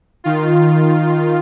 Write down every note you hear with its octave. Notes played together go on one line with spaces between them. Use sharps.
D#3 F4